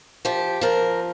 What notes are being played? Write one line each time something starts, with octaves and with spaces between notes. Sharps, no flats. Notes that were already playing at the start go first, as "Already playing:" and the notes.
F3 G4
F3 A#4